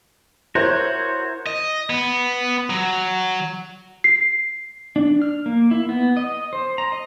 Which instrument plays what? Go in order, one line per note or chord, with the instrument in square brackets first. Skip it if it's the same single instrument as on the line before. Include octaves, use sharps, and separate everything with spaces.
[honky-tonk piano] E4 A#4 C5 [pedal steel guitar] F#4 C#5
[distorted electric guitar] D#5
B3
F#3
[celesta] C7
[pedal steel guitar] D4
F6
A#3
E4
B3
D#5
C5
A#5
D#5